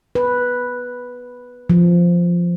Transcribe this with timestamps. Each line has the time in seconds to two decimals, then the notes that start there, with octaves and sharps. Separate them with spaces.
0.15 B4
1.70 F3